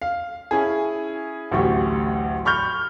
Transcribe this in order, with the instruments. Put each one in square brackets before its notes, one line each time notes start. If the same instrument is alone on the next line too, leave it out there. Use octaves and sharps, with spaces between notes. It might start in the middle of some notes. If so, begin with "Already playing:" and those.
[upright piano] F5
C#4 E4 G#4
A1 D2 F#3 G4 C#6
B5 C#6 F6 G6